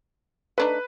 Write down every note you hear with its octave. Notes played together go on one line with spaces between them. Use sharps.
A3 D4 D#4 B4